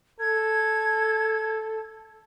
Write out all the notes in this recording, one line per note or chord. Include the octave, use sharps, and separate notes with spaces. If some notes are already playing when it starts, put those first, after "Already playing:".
A4 G#6